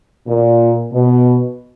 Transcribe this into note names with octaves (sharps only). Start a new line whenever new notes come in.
A#2
B2